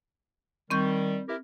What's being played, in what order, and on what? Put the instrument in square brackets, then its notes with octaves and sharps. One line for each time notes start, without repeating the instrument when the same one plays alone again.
[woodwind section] D#3 G3 [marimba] C4 C#6 G6
[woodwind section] E4 G4 A#4